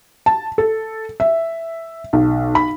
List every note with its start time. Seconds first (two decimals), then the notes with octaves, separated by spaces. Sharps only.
0.26 A5
0.58 A4
1.20 E5
2.13 B1
2.55 B5